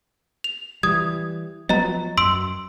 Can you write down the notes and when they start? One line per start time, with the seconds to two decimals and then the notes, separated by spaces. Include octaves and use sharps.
0.44 F7
0.83 E3 G3 D#6 G#6
1.69 F3 F#3 B3 D#5 A#5
2.18 F#2 C6 E6 D7